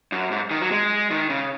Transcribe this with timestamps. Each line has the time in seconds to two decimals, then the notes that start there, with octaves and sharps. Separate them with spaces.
0.12 F#2
0.31 G#2
0.51 D#3
0.61 F#3
0.71 G#3
1.11 D#3
1.30 C#3